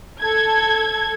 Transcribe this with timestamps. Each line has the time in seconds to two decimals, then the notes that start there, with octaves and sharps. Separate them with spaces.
0.20 A4 G#6